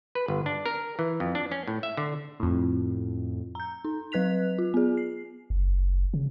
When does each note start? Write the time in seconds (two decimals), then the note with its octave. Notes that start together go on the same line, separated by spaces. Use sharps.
0.15 B4
0.28 G1
0.46 D4
0.66 A#4
0.99 E3
1.20 F2
1.35 D4
1.52 C#4
1.67 A2
1.83 E5
1.97 D3
2.40 F2 A2
3.55 A#5 G6
3.85 D#4
4.12 F#3 B4 F#6 B6 F7
4.59 F4
4.74 B3 G#4
4.97 C7
5.50 F#1
6.14 C#3